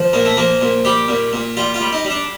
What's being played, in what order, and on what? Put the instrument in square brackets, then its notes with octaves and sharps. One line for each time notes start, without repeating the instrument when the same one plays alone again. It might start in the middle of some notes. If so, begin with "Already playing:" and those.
Already playing: [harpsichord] F3
A#2 A#3
A3
F3 A#3
A#2
G3 G4
A#2
A#2
G3 F4
F4
G3
D#4
G3
D4